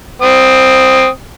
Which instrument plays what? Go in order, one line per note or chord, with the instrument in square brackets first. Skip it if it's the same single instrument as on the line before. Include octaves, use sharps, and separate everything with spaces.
[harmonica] C4 D#6